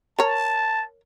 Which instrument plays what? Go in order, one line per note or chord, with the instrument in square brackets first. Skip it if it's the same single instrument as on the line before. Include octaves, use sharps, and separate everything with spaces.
[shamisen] A#4 C#5 [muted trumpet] A5